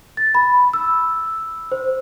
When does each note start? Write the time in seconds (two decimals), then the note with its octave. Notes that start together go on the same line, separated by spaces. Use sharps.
0.17 A6
0.35 B5
0.73 E6
1.72 C5